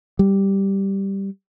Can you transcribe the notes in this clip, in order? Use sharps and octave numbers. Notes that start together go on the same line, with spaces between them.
G3